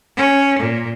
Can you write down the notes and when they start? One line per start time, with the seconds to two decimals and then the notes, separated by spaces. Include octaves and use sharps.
0.17 C#4
0.59 A#2